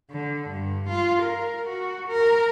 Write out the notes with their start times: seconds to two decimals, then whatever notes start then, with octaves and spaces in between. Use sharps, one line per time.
0.11 D3
0.50 G2
0.89 F4
1.22 A#4
1.68 F#4
2.08 A#4